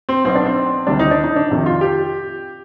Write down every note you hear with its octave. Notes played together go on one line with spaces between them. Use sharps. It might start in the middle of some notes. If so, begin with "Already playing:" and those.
C4
B1 B2 B3 C4
D4
C4
D2 C3 D#3 G3 D4
D#4
D4
D#4
D4
F2 C3 D#3
F4
G4